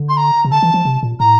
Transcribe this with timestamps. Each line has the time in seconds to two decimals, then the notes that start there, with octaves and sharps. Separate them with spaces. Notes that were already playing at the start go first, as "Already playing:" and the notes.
Already playing: D3
0.09 C6
0.17 A#5
0.45 C3
0.51 D3 A5
0.63 E3
0.74 F3
0.85 C3
1.03 A#2
1.20 A2 A#5